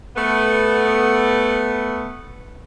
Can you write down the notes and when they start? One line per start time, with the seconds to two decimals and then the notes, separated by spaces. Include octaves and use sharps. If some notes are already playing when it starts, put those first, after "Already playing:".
0.15 A3 B3